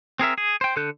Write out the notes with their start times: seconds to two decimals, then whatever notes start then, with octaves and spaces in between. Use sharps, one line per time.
0.19 C4 G#4 A#4 E5
0.38 G#4
0.61 C5 G5
0.76 D3 A4 F#6 G6